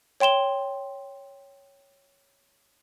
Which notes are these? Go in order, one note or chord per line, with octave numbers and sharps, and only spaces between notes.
C#5 G5 C6 E7 G7